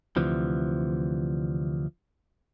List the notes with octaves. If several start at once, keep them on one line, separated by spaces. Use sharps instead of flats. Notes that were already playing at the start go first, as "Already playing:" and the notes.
D2 C3 E3 F3